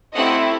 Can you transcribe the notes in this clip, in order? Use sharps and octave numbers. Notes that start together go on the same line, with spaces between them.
A3 C4 E4 G4 D#5 F#5